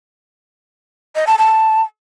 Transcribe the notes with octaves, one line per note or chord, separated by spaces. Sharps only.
D#5
A5
A5